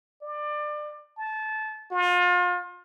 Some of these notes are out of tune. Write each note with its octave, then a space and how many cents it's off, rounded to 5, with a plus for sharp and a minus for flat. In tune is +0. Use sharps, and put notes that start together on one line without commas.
D5 +25
A5 -20
F4 +35